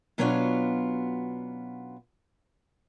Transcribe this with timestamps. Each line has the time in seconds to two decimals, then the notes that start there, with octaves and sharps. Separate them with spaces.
0.18 B2 F#3 B3 C#4 D4 F4